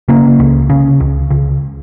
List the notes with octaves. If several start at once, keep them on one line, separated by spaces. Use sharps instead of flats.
C#3 A#3
C#2
C#3
C#2
C#2